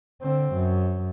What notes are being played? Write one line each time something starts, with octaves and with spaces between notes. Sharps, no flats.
D3 C4
F#2